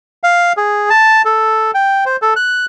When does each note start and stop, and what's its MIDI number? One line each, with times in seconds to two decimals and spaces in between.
0.23 0.53 77
0.57 0.90 68
0.90 1.22 81
1.25 1.71 69
1.74 2.04 79
2.06 2.16 72
2.22 2.34 69
2.36 2.66 90